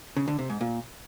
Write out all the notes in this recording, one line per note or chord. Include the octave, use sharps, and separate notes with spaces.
C#3
D3
C3
G#2
A#2